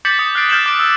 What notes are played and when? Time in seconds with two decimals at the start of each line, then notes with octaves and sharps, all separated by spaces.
0.05 D6 G6 A6 B6 C#7 F#7
0.19 D#6 C#7
0.35 F6 F#6 A6 C7 D7
0.49 F6 G6 A6 C#7 E7 F#7
0.66 D6 D7
0.80 E6